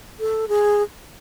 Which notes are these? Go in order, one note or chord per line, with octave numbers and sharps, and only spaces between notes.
A4
G#4